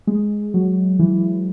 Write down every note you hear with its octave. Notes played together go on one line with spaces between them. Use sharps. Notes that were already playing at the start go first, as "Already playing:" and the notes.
G#3
F#3
E3